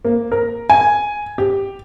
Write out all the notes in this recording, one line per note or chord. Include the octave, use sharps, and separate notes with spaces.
A#3
A#4
G#5
G4